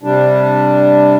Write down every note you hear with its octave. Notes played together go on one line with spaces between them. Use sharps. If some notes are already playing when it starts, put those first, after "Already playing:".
C3 G3 D4